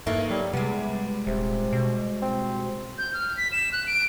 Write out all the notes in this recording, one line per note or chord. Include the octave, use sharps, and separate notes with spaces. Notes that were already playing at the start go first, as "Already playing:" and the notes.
G2 A3 A#3 D#4 A4
F#3 G3
C3 G3 G#3 B3
D#1 C3
B2
C4
G6
F6
B6
E7
F#6
D7